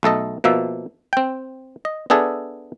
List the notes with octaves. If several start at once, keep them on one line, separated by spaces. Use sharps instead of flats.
B1 A3 A4 D#5
B2 F3 A#3 E5
C4 G5
D#5
B3 D4 G#4 A4 E5